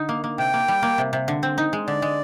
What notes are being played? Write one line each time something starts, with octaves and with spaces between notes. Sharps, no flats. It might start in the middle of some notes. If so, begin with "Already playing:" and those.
Already playing: D3 D#4
A#3
A#3
C3 G5
A#3
G3
A#3
C3
C3
D3
C4
D#4
G#3
D3 D5
G#3